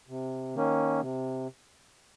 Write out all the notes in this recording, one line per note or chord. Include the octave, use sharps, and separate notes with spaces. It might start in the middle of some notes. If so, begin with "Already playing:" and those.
C3
D#3 A#3 C#4
C3